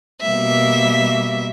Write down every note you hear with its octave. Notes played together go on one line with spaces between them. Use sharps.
B2 G3 A#3 E5